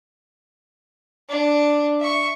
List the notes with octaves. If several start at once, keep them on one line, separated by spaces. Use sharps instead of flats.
D4
E5 C#6